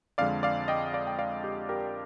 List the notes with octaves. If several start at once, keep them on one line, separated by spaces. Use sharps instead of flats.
F2 D3 G#3 D5 F5
D5 F5
D#5 G5
D5 F5
G5
D5 F5
G4
G4 A#4